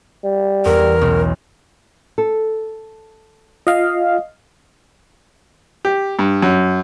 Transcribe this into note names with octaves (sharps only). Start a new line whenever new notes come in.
G3
E2 A#4
B1
A4
F4 D#5 F5
G4
G2
F#2